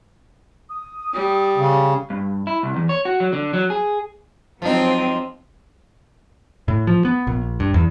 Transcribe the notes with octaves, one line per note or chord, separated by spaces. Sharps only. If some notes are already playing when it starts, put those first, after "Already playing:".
D#6
G3
C#3
G2
E4
C2
E2
C#5
F#4
F#3
D3
F#3
G#4
F3 F#3 G#3 C4 D#4
A2
F3
B3
A#1
G2
E2